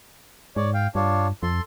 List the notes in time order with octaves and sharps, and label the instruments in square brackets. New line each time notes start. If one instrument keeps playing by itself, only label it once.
[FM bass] G#2 [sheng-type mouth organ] C#5 D5
[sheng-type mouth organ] F5 G5
[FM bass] G2 [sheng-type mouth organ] D4 F4 C#5
[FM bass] F2 [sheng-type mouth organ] A4 C6